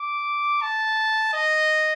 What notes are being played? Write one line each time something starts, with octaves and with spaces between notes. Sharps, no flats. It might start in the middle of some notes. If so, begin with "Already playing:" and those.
Already playing: D6
A5
D#5